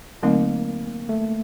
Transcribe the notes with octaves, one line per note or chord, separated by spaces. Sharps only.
D3 F#3 A3 A#3 C4 D#4
A3